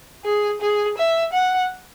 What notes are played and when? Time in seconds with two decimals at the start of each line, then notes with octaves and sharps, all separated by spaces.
0.25 G#4
0.61 G#4
0.98 E5
1.33 F#5